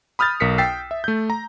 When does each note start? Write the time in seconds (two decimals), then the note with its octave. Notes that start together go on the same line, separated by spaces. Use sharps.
0.19 B5 D#6 F6 G6 A6
0.40 B1 A#4 B6 C#7
0.58 G5 E6 A6 B6 C7
0.91 E5
1.04 A3 G6
1.30 A#5